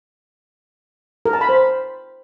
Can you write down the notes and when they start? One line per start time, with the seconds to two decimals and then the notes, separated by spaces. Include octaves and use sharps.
1.26 A#4
1.33 A5
1.41 B5
1.49 C5